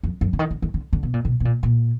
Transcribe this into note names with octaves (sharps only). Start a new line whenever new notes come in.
F2
F#2
D3
D#3
D3
D#3
D3
D3
B2
A#2
B2
B2
A#2
A#2